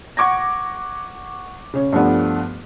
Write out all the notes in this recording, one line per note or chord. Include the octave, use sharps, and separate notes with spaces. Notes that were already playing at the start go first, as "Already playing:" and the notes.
F#5 C#6 D6 G#6 A#6
C#3 C#5
G2 F3 A3 B3 D4